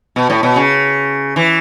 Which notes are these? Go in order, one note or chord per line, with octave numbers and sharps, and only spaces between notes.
B2
A2
B2
C#3
E3